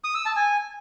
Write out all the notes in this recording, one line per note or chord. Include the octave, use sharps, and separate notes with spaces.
D#6
E6
A5
G#5